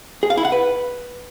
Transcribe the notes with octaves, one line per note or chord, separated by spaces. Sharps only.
G#4
F5
E4
F#5
B4